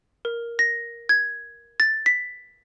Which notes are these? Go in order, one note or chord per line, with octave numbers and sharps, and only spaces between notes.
A#4
A#6
G#6
A6
B6